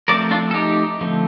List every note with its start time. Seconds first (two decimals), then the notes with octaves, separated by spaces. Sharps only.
0.08 F3 A3 C4 A#4 D5
0.31 D4 F4
0.51 A4
0.54 D#4 G4
1.01 D3 F3 A3 C4